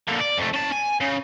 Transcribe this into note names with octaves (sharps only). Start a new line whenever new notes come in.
A#2 D3
D5
F2 A3
C#4 A5
G#5
C#3